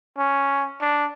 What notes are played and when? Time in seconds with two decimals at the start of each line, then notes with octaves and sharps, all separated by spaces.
0.18 C#4
0.81 D4